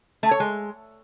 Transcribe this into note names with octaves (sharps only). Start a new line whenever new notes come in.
A3
C#5
G#3